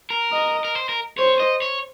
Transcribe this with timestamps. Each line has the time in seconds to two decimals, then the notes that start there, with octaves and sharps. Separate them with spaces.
0.10 A#4
0.32 D#5
0.65 A#4
0.75 C5
0.89 A#4
1.18 C5 C#5
1.40 D#5
1.62 C#5